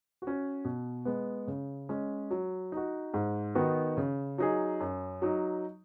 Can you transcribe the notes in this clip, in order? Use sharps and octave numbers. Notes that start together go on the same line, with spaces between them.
F#4
C#4
B2
G#3 B3
C#3
G#3 C#4
F#3
D#4 F#4
G#2
D#3 B3 D#4 F#4
C#3
F#3 D#4 G#4
F#2
F#3 D#4